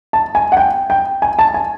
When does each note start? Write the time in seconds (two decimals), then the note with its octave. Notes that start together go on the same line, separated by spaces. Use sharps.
0.13 A5
0.35 G#5
0.52 F#5
0.57 G5
0.90 G5
1.22 G#5
1.39 A5
1.54 G#5